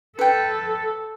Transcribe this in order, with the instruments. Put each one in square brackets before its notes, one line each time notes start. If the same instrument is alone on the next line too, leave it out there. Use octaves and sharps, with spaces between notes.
[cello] A4 [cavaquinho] B4 G5